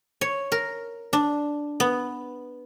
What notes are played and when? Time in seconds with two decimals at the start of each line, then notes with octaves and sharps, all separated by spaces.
0.21 C#5
0.52 A#4
1.13 D4
1.80 B3